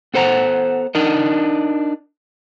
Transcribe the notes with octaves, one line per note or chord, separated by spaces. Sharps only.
B3 A4 C5 F#5 A#5
D4 D#4 A#4 D#5